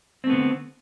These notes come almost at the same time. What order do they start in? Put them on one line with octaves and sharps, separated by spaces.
C4 A3 B3 D3